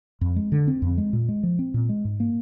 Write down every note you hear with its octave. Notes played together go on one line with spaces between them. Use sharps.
F2
G#3
D3
C4
F2
G#3
A#2
G#3
F3
C4
A#2
G#3
G#2
A#3